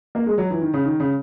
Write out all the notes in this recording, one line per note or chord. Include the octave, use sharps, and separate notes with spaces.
A#3
G#3
F#3
E3
D#3
C#3
D#3
C#3